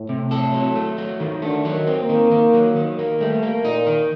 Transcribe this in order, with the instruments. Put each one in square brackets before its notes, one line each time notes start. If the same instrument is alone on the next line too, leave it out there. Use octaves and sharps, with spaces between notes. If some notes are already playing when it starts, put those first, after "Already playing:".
Already playing: [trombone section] A2
[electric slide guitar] C3
A4
F#3
A3
F#3
D#3
[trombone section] D3 [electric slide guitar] A3
[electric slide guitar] F#3
[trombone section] D#3
[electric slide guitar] C4
[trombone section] A#3
[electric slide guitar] D#3
D#3
F#3
D#3
A#3
[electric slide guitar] G3 [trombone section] A3
[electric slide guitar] A#3
[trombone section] A#2 [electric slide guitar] D#4
[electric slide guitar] D#3